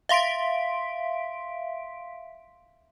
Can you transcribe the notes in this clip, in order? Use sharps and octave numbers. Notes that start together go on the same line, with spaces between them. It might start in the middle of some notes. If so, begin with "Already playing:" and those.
E5 F5 C6 B6 D7